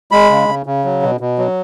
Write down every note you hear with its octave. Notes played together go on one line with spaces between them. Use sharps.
G#3 B5
C#3
C#3
C#3
F#3
B2
B2
F#3